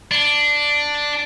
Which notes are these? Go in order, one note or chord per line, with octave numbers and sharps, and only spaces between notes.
D4